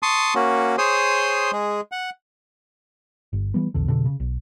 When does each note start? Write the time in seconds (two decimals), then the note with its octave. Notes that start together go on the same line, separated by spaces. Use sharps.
0.03 A5 C6 C#6 D#6
0.35 A#3 C#4 F#4
0.78 G#4 C5 C#5 C6 D#6
1.52 G#3 G#4
1.92 F#5
3.33 G1
3.54 E3 G3 B3
3.74 A#1 E2 D3
3.87 F1 B2 D3 D4
4.05 C#3
4.20 B1